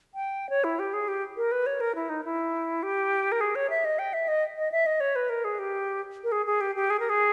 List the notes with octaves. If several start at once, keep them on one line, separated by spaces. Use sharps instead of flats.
G5
C#5
E4
G4
G#4
G4
A#4
B4
C#5
A#4
E4
D#4
E4
G4
A#4
G#4
C#5
E5
D#5
G5
E5
D#5
D#5
E5
D#5
C#5
B4
A#4
G#4
G4
A#4
G#4
G#4
G4
G4
G#4
A#4
G#4